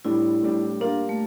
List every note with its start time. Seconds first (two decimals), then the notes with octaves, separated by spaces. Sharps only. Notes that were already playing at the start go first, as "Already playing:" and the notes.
0.05 A2 G3 D4 E4
0.43 A2 G3 D4
0.81 G3 A#3 D4 F4 A#4
1.09 A3